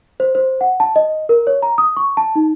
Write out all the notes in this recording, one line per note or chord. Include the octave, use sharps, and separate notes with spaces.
C5
C5
F#5
A5
D#5
A#4
C#5
A#5
D#6
C#6
A5
D#4